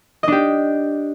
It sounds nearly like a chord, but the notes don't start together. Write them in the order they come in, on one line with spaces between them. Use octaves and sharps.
D#5 D4 G4